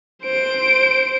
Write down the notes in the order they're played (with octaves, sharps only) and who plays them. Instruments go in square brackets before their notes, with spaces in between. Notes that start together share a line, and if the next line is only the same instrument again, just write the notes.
[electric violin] C5 D7